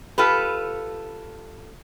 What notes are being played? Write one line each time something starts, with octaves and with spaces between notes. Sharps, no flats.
F4 G4 A4 B4